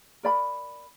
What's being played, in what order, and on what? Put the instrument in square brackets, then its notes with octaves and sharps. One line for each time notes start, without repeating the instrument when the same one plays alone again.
[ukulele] A#4 D5 B5